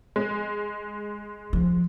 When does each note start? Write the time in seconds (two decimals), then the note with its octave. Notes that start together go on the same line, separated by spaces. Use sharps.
0.16 G#3
1.53 F3